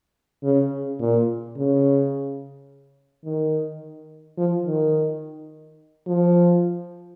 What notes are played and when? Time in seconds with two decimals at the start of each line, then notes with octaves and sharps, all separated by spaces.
0.44 C#3
1.00 A#2
1.57 C#3
3.25 D#3
4.38 F3
4.66 D#3
6.08 F3